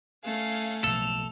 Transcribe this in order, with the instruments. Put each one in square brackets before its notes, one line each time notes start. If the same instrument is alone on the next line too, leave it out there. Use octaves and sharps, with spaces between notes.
[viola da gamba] A3 C#4 [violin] F5 G#5
[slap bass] B1 A2 F3 [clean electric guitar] A4 [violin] F7